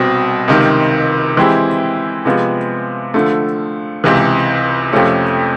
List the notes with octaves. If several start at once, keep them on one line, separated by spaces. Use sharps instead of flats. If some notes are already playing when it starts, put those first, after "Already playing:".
Already playing: C2 B2 G3 C4
C#2 C3 D#3
E3 G#3 C4 E4 G4
C3 F3 G#3 B3
D3 F3 A3
C#2 C3 E3
F2 C3 F3 A3 C#4